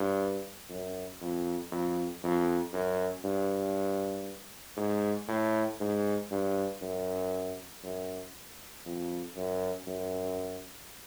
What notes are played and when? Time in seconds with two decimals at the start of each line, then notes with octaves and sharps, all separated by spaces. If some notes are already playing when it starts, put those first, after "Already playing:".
Already playing: G2
0.69 F#2
1.21 F2
1.72 F2
2.23 F2
2.73 F#2
3.24 G2
4.77 G#2
5.28 A2
5.80 G#2
6.31 G2
6.82 F#2
7.83 F#2
8.86 F2
9.36 F#2
9.87 F#2